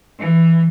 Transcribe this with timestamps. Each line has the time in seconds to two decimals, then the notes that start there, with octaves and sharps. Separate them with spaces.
0.18 E3